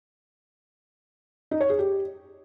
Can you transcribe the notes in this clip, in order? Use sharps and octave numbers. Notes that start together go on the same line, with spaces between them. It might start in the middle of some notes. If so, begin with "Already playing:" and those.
D#4
C#5
G#4
G4